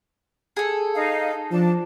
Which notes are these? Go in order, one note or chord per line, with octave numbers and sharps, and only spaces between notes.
G#4 A4
D#4 F5
F3 D4 A5